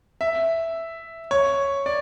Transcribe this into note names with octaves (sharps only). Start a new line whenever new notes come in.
E5
C#5
D5